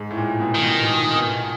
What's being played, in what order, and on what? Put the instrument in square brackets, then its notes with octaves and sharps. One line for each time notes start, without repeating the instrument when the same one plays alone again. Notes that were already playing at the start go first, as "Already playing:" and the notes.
Already playing: [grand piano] G#2
A2
A#2
B2
[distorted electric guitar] D#3
[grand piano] B2
B2
A#2
B2